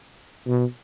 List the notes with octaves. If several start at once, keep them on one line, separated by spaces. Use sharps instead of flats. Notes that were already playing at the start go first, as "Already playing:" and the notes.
B2